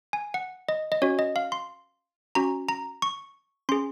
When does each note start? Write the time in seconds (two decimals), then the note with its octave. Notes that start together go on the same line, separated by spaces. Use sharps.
0.13 G#5
0.34 F#5
0.69 D#5
0.92 D#5
1.02 C#4 F#4 C#5
1.19 D#5
1.36 F5
1.52 C6
2.35 C#4 F#4 A#5
2.69 A#5
3.02 C#6
3.69 C#4 C6
3.72 G#4